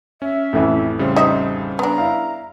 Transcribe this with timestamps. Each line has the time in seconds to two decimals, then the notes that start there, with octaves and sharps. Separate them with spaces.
0.22 C#4 E5
0.53 A1 F2 E3
0.99 C#3 G3 C5
1.16 D#4 C5 D#5 E5
1.79 B3 D4 A#5
1.98 E4 F5